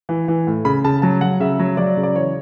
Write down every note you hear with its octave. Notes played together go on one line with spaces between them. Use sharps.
E3
E3
A2
C#3 B5
C#3 A5
F#3 A5
F#3 F#5
C#3 E5
F#3
F#3 D5
C#3
D5
E3 C#5